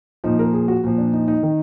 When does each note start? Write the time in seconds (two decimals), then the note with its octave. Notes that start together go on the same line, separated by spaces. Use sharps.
0.24 A#2 F3 D#4
0.39 A#4
0.54 G#4
0.68 F#4
0.84 A#2 F3
0.98 D4
1.13 D#4
1.28 D#4
1.43 D#3